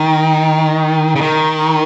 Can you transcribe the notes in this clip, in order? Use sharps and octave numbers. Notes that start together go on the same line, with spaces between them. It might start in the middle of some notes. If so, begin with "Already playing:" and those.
Already playing: D#3
C#3
D#3